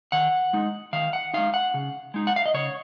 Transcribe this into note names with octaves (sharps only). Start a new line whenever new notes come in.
D#3 F#5
G#3 D#4
D#3 F5
F#5
G#3 D#4 F5
F#5
C#3
G#3 D#4
F#5
F5
D#5
C#3 C#5